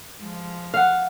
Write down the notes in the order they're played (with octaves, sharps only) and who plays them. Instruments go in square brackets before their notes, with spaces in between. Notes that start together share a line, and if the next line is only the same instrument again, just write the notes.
[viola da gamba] F3 G#3
[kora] F5 F#5